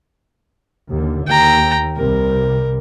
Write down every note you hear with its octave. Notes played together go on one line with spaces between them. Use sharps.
D#2 D3
D#2 G5 A#5
C2 C3 G3 A#4